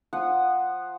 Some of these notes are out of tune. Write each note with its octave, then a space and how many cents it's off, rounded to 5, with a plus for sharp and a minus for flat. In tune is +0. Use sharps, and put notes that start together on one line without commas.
F3 +0 F#5 +0 D#6 -15